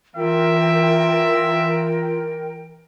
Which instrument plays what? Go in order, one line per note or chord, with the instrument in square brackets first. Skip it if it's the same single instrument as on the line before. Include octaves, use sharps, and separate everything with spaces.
[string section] E3 [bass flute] F4 [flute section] A#4 G5 [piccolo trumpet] E5